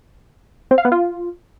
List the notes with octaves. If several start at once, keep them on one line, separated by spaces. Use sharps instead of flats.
C4
F5
B3
F4